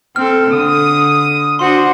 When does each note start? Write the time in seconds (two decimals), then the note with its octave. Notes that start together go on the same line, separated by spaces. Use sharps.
0.16 C4 A4 F6
0.51 D3 D#6
1.59 D4 F#4 C5 C6